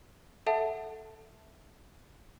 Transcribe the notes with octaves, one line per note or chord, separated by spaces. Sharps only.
A4 E5 F#5 A5